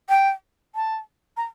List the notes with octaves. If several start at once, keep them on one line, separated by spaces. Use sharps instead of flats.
G5
A5
A#5